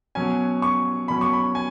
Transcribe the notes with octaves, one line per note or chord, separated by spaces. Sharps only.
B2 F#3 C#4 G#5
C#6
B2 F#3 C#4 B5
C#6
B5
G#5